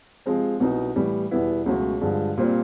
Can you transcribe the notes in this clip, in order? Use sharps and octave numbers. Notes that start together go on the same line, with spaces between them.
C3 F3 G#3 C4
C2 B2 F#3 B3 D#4
A2 E3 G3 B3
E2 B2 G3 B3 E4
C#2 B2 F#3 A3 C#4
G2 D3 F3 G#3
A#2 G3 C4 F4